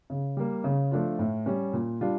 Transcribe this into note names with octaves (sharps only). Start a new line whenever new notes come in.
C#3
G3 A#3
C#3
F3 A3 D4 F4
A2
G3 C#4
A#2
G3 D4 F4